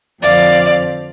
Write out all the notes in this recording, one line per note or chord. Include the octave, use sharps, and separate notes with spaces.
F2 D3 F3 C4 D5 F5